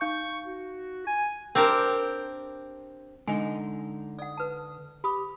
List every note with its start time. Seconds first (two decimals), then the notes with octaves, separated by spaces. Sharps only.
0.01 D#4 F5 C#6 G6
0.45 F#4
1.07 G#5
1.55 C4 D4 G4 A#4
3.28 D3 G#3 D#4 G#5
4.19 D5 F#5 D#6
4.37 B4 A5
5.04 G4 B5 D#6